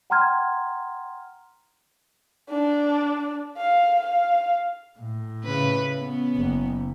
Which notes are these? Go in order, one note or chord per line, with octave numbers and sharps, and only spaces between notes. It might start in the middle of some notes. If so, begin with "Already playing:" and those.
F#5 G5 A#5 C6 F6 G#6
D4
F5
F5
A2
C#3 B4
B3 C#4
F#1